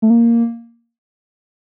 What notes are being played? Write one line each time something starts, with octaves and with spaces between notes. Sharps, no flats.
A3
A#3